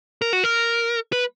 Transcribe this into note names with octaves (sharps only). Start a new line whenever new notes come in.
A#4
F#4
A#4
B4